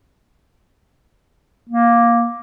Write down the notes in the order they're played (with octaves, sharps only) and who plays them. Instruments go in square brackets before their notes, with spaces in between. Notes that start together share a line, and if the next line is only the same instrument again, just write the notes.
[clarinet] A#3